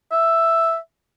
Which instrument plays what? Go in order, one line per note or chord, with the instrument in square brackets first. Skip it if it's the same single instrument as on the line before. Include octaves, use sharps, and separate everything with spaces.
[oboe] E5